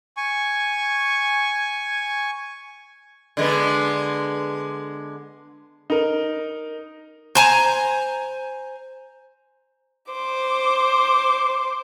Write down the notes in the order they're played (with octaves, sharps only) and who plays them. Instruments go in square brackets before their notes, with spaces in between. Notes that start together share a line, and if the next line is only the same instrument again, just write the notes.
[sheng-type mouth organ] G#5 C#6
[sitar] D3 G#3 B3
[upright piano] D#4 A#4
[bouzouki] C5 G#5 A#5
[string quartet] C5 D6